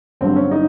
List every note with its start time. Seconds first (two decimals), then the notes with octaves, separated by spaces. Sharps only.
0.21 G1 G2 D3 F#3 C4
0.36 C#4
0.51 D#4